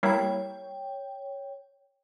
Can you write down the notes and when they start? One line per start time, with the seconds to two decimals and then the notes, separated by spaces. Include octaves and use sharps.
0.03 G3 A#3 E4 C#5 G5